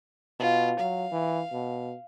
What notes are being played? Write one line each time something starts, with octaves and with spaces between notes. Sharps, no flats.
B2 F4
F#3 F5
E3
B2